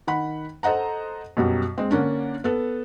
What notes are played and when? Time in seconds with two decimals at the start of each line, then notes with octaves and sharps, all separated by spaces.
0.07 D#3 F#5 B5
0.63 A4 C5 D#5 F#5 A#5
1.37 F#2 B2 F#3 G3
1.78 G#3 C4
1.91 D3 A#3 C#4 D4
2.44 B3 A4